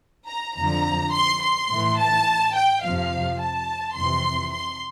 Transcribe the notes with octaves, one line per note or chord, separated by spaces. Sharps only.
A#5
F2 D3 F3 A#5
C6
C6
A2 E3
A5
G5
F2 C3 F3 F5
A5
F2 C3 E3 C6
C6